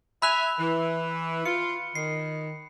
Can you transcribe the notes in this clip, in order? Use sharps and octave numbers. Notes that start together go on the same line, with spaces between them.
E5 G#5 B5 F#6 F7
E3
F4 C#7
D#3 C7